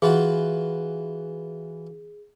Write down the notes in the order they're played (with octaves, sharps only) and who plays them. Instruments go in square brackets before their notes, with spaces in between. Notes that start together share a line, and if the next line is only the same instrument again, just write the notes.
[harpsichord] E3 F4 F#4 [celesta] G#4